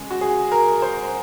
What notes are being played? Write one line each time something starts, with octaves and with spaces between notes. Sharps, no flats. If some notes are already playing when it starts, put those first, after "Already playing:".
Already playing: C#3 G#3
F#4
G#4
A#4
C5